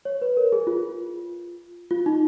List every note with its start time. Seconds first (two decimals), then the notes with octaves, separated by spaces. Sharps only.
0.05 C#5
0.22 B4
0.37 A#4
0.52 G#4
0.67 F4
1.91 F4
2.06 D#4